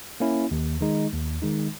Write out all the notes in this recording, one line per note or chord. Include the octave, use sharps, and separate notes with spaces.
A#3 C#4 E4
D#2
D#3 G#3 D#4
D#2
D#3 G#3 D#4